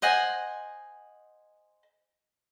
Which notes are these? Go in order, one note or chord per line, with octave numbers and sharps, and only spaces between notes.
C5 D#5 F#5 G#5